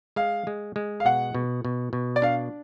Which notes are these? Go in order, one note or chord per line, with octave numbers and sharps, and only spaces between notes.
G#3 F5
G#3
G#3
F5
B2 F#5
B2
B2
B2
D5
D4 F5